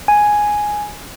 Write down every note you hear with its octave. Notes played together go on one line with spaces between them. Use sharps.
G#5